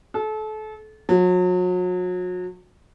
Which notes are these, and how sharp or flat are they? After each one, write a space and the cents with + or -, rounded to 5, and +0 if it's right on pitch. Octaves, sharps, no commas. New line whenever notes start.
A4 -30
F#3 -35